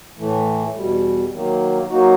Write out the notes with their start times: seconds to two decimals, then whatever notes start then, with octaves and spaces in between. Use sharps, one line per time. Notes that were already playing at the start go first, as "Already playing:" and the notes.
0.17 A2 E3 A3
0.75 E2 B2 G3
1.32 D#3 F#3 A#3
1.90 F#3 A#3 D#4 F#4